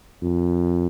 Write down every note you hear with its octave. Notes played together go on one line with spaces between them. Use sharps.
F2